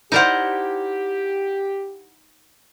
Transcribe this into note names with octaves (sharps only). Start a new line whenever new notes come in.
D#4 E4 G4 A#4 C5 D5 F#5